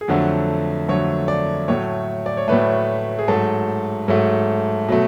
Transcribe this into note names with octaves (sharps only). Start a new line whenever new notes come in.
G#4
F2 D3 F#3 A3 F#4
F2 D3 F#3 A3 C#5
D5
A2 F#3 A3 C#5
D5
C#5
A2 F#3 A3 B4
G#4
G#2 F#3 A3 A4
G#2 F#3 A3
B2 F#3 A3